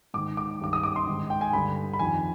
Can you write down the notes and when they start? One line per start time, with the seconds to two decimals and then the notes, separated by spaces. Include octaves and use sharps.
0.14 G#2 D#3 D6
0.37 D6
0.61 G2 D#3 D6
0.73 D#6
0.83 D6
0.96 C6
1.07 G#2 D#3
1.30 G5
1.41 G#5
1.53 G2 D3 B5
1.93 B5
1.99 F2 D#3 G#5